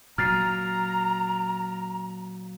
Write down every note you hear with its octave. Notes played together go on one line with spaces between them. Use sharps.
A#2 F#3 A#5 F6 A6 C7